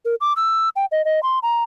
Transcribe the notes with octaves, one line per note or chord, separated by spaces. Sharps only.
A#4
D6
E6
G5
D#5
D#5
C6
A#5